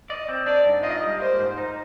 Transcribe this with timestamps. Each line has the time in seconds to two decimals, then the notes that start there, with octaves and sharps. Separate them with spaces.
0.10 D5 D#5
0.28 C4
0.46 D4 D5
0.66 G#2
0.83 F4 D#5
1.02 G3
1.20 A#3 C5
1.39 G#2
1.58 D#4